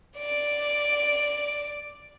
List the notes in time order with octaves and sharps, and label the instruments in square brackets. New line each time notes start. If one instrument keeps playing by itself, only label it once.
[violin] D5 D7